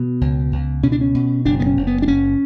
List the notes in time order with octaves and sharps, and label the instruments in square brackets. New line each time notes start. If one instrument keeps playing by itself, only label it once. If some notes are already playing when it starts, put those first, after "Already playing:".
Already playing: [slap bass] B2 B3
C#2
C#2
B2 C#4
D4
C#4
B2
F#1 D4
B3
C#4
F#1
B3
D4
F#1 C#4